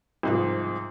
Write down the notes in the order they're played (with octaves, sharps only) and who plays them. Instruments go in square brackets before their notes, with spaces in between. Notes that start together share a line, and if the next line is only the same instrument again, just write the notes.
[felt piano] C2 G#2 F3